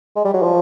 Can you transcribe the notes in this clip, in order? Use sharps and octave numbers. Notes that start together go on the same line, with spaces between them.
G#3
G3
F#3
F3